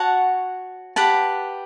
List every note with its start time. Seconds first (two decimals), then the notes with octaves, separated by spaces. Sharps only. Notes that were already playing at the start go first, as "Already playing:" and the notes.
Already playing: F#4 C#5 F#5 A5
0.96 G4 B4 F#5 A5